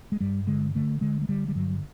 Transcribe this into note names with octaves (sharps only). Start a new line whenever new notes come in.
G#3
G2 G3
D3 G#3
D3 A3
D3 G#3
G#3
D3 G3
G3
G2 F#3